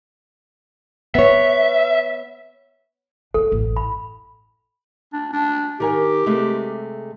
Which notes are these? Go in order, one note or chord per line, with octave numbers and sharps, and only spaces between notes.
B3 C#5 E5
A#3 D4 A4
A1 F#2
B5
D4
D4
D#3 G4 A#4 G#5
C3 G#3 A3